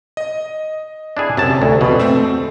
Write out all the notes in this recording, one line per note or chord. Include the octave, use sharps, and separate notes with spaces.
D#5
D4 E4 G#4
F#2 C3 A5 A6
D2
F2 B2
A3 C4 E5